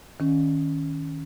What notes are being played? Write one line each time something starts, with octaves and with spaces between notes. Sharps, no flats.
D#3 C#4